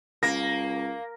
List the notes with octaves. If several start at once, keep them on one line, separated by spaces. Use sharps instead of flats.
C#2 A#3 A#6